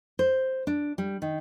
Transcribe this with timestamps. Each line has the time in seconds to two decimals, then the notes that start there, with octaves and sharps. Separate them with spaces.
0.19 C5
0.67 D4
0.98 G3
1.22 D#3